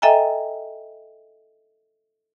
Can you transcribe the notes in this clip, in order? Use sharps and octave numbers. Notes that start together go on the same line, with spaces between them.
A4 D#5 E5 G5 G#5 A#5